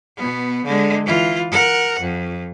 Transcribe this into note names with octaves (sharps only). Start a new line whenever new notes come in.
B2 B3
D3 G#3
E3 F4
A#4 F#5
F2